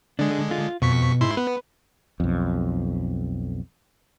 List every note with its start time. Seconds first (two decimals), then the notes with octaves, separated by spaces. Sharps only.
0.19 D3 G#3 D4
0.51 F4
0.82 F2 B2 C#6 B6
1.21 G#2 E4 C6
1.37 B3 B4
2.20 B1 F2